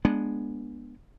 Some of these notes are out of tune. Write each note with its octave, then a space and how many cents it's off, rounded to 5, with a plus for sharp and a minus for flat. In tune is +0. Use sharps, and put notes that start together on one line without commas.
G#3 +0 B3 -20 D4 +5